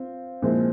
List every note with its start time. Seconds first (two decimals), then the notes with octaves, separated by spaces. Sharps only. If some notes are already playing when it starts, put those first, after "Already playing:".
Already playing: C4 F4
0.42 A#2 F3 G#3 C4 E4